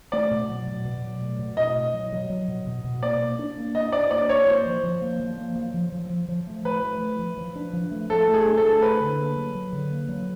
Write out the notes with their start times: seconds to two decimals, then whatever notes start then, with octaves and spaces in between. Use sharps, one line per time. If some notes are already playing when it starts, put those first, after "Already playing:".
0.12 A3 D5
0.31 B2
0.49 F#3
0.68 B2
0.85 B2
1.03 F#3
1.21 A3
1.39 B2
1.57 A3 D#5
1.76 B2
1.94 F#3
2.12 F#3
2.30 F#3
2.48 B2
2.67 B2
2.84 B2
3.03 A#3 D5
3.21 A#3
3.39 D4
3.57 A#3
3.74 D4 D#5
3.92 D4 D5
4.11 A#3 D5
4.29 A#3 C#5
4.47 A#3 C5
4.66 F3
4.83 F3
5.02 A#3
5.20 F3
5.37 A#3
5.56 F3
5.74 F3
5.92 F3
6.10 F3
6.28 F3
6.47 A3
6.65 F3 B4
6.83 A3
7.01 F3
7.19 F3
7.37 F3
7.56 D4
7.73 F3
7.91 A3
8.10 A3 A4
8.28 A3
8.34 G#4
8.46 D4
8.57 A4
8.63 A3
8.82 D4 B4
9.00 D3
9.18 A#3
9.36 F#3
9.55 F#3
9.73 D3
9.91 A#3
10.09 F#3